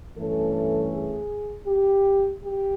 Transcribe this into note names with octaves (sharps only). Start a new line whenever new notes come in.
G2 E3 A3 C#4 A4
G#4
G4
G4